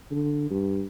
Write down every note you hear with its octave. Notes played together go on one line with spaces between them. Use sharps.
D3
G2